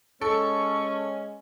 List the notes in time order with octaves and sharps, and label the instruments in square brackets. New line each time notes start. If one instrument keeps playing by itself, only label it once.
[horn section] G#3 C#4 [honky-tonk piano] A4 [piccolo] C#6